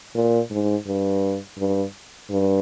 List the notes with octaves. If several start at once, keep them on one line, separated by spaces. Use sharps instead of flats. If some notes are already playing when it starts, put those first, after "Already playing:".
A#2
G#2
G2
G2
G2